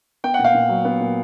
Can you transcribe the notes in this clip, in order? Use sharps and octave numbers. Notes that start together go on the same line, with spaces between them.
B3 G5
A#2 F#5
F5 G5
A#2
F#3
B3
A#2